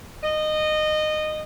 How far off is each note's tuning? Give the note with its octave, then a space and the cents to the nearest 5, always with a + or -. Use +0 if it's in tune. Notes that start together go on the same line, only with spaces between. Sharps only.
D#5 -20